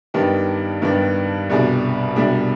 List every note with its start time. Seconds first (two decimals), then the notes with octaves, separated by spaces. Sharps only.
0.14 G2 D#3 B3 D4 G4
0.82 G2 D#3 B3 D4 G4
1.50 C2 B2 G3 D4 G#4
2.16 C2 B2 G3 D4 G#4